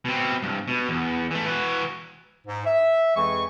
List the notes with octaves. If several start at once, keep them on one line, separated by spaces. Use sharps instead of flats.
B2 C4
C2 G2
B2
E2
E3 A3
E3 F#4
G#2
E5
F2 E3 G#3 G#4 C#6